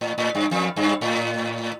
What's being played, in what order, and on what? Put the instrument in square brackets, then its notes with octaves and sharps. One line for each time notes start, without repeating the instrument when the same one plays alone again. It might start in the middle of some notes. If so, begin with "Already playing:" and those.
[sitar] A2
A2
G2
F2
G2
A2